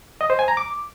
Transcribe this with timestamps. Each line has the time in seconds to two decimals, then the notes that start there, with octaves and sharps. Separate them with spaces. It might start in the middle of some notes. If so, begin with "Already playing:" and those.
0.21 D#5
0.30 C5
0.39 G#5
0.48 A#5
0.57 D6